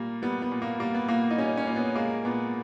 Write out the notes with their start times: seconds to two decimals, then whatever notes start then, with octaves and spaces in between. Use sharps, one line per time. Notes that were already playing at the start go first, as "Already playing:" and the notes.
Already playing: A#2 G3 A#3
0.22 G3 B3
0.42 B3
0.51 A#2
0.62 A#3
0.80 G3 A#3
0.94 B3
1.08 A#2 A#3
1.30 D#4
1.38 G3 C#4
1.57 C#4
1.67 A#2
1.76 B3
1.95 G#3 A#3
2.25 A#2 B3